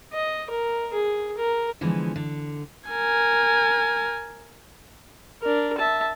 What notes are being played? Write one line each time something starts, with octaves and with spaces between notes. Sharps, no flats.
D#5
A#4
G#4
A#4
D3 E3 F3 G#3 B3
D3
A#4 G#5
D4 A#4
E5 A5